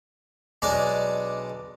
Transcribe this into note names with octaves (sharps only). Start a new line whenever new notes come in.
B1 G#3 D4 D5